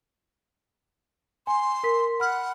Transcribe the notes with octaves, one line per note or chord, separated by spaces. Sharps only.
G#5 C6
A#4 B6
F#5 B5 F6